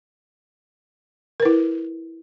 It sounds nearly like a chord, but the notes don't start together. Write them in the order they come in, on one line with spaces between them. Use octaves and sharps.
A#4 B4 E4